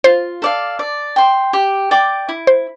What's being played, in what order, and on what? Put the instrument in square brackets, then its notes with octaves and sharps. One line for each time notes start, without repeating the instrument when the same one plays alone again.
[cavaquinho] F4 [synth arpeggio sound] C5
[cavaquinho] A4 D5 F5
D5
G5 C6
G4
D5 G5 D6
E4
[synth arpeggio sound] C5